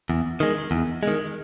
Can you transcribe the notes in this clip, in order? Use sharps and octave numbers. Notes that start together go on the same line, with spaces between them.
E2
D#3 G#3
E2
D#3 G#3